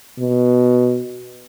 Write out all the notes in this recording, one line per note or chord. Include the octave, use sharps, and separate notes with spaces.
B2